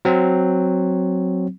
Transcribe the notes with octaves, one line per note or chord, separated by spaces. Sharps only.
F#3 C4